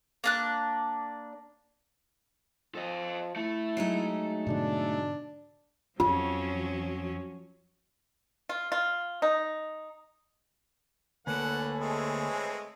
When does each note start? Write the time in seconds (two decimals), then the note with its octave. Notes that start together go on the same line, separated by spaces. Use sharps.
0.24 A#3 D4 F#6
2.75 F3 A4 D#5
3.36 A3 E4
3.77 F#3 G#3 D#4
4.47 G#2 B2 D3 D4
6.00 F2 F3 F#3 C#4 F4
8.49 F4
8.72 F4
9.22 D#4
11.27 D2 D3 A#3 A4 B4 C#5 F#5 G#5
11.80 G#3 A3 C4